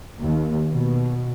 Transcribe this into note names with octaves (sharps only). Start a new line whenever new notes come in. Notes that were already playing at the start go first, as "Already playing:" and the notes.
D#2
B2